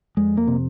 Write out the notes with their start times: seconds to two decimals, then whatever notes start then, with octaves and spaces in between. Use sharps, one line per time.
0.17 F2 G#3
0.37 A#3
0.47 C3